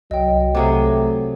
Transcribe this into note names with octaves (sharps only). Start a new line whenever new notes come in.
C2 F#3 D#5 G5
C3 F#3 A3 G#4 D6